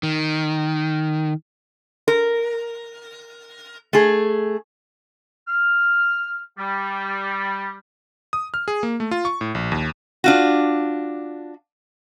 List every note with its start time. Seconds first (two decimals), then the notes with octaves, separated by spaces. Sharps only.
0.03 D#3
2.08 A#4
3.93 A3 G#4
5.48 F6
6.58 G3
8.33 D#6
8.54 F6
8.68 G#4
8.83 A#3
9.00 A3
9.11 F4
9.25 C#6
9.41 A2
9.55 A#1
9.72 D#2
10.24 D4 F4 F#4